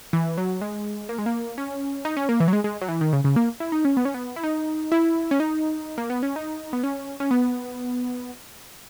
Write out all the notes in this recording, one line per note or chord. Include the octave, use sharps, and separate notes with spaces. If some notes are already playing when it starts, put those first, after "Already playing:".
E3
F#3
G#3
A#3
G#3
A#3
C#4
D#4
C#4
A#3
E3
F#3
G#3
G#3
F#3
E3
D#3
C#3
C#3
A#3
E4
D#4
C#4
B3
C#4
B3
E4
D#4
E4
C#4
D#4
A#3
B3
C#4
D#4
B3
C#4
C#4
B3